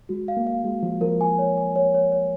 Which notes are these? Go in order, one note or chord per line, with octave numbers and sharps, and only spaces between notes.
G#3 F#4
F5
A#3
F5
G#3 F#4
F3 F#4
F3 A#4
G#5
C#5
G#5
C#5
C#5
C#5